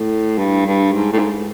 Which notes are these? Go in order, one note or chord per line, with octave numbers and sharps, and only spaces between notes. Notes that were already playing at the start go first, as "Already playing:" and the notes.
Already playing: A2
G2
G2
G#2
A2
G#2